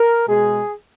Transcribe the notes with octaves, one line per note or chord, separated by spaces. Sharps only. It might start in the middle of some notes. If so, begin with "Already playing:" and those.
Already playing: A#4
B2 G#3 G#4